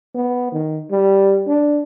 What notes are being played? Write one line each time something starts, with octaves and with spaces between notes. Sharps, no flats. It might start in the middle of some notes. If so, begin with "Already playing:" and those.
B3
D#3
G3
D4